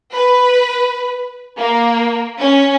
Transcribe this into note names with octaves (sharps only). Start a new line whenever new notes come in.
B4
A#3
C#4